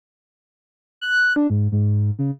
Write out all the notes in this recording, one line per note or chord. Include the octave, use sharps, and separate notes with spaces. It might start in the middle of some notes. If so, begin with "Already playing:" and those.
F#6
D4
G#2
G#2
C#3